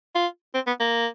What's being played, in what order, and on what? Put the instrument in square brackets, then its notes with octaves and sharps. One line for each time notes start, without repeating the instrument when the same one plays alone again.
[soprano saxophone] F4
C4
B3
A#3